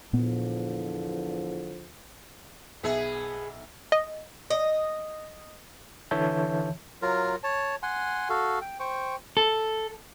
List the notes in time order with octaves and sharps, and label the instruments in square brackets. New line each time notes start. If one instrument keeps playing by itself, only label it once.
[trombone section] E2 D3 F3 [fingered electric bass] A#2 B3
[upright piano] B1 E5 [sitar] B3 G#4
[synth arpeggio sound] D#5
[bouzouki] D#5
[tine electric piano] D3 E3 C#5 E5 A5 G6
[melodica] F#3 F4 A#4
C#5 A5
F#5 G#5 C6
F#4 A4 F5
G5
C5 G5 C#6
[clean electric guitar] A4